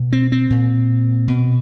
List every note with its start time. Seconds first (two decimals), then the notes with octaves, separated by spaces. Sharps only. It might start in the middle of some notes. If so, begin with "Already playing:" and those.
Already playing: B2
0.13 C4
0.32 C4
0.50 A#2
1.28 B2